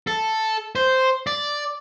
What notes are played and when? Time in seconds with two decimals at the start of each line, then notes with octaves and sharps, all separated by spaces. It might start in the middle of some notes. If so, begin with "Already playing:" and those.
0.07 A4
0.76 C5
1.27 D5